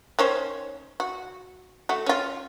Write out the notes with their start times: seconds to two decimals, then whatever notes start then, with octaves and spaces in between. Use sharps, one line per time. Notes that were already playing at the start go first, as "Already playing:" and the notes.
0.19 D#3 C#4 C5
1.00 F#4
1.89 A3 F#4
2.06 C#4 F4